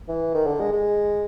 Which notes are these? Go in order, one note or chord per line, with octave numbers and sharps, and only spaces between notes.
E3
D#3
D3
G#3
G#3